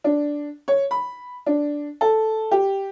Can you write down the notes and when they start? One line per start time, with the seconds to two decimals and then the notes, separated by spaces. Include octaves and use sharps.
0.04 D4
0.68 C#5
0.91 B5
1.46 D4
2.01 A4
2.51 G4